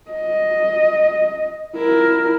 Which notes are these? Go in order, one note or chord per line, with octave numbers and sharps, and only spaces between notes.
D#5
E4 A#4